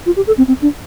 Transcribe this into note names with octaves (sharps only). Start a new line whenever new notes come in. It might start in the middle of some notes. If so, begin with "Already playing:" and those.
F4
G4
A4
C4
C4
D4